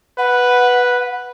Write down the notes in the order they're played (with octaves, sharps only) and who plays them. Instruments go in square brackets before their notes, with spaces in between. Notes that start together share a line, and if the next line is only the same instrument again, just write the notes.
[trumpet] B4 [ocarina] F#5